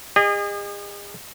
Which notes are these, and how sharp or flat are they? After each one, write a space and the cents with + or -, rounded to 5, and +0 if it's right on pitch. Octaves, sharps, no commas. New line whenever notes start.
G#4 -40 D#5 -30